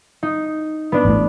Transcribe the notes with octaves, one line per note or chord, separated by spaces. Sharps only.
D#4
B3 D4
A1 A2